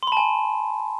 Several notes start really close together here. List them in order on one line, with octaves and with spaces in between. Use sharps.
C6 B5 A5 G#5